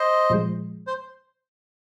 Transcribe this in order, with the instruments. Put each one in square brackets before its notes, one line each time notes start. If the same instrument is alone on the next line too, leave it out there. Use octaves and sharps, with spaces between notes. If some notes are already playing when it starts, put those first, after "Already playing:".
Already playing: [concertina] C5 D#5
[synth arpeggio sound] A#2 F3 G#3
[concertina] C5